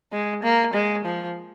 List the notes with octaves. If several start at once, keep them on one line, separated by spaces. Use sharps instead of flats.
G#3
A#3
G#3
F3